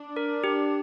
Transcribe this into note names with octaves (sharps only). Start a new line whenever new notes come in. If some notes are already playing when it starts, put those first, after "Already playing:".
Already playing: D4
A#4
G4